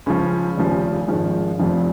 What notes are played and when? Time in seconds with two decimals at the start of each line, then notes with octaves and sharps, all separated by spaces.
0.06 C#2 C#3 F3 C#4
0.57 F1 D#2 C#3 F3
1.08 G#1 G#2 F3
1.59 F1 F2 C#3 F3